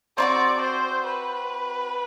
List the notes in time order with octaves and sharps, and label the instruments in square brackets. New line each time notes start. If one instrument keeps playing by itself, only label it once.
[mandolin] C4 D#4 F#4 [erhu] D5
[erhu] C5
B4